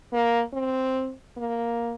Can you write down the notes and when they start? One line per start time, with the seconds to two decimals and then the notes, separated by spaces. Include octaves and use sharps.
0.13 A#3
0.54 C4
1.37 A#3